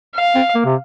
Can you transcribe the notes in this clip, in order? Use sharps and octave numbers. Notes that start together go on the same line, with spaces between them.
F5
C4
A#3
C3